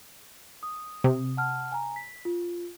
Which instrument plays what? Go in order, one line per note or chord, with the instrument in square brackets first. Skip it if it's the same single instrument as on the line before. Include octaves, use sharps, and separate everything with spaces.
[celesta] D#6
[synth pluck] C3
[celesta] F#5 A5 F6
G#5 A#5
B6
F4